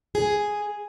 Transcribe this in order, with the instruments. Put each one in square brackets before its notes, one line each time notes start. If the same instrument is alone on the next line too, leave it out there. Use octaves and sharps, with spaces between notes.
[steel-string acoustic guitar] G#4